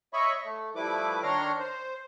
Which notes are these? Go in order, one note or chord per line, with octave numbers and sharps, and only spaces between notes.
C#5 D#5 E5 B5 C#6
A3
F3 G3 A3 E4 B4 D6
D#3 D4 C#5 A#5 C6 F6
C5